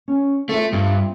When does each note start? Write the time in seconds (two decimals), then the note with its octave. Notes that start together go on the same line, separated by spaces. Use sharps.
0.08 C#4
0.49 A3 C4 F4 E5
0.73 G2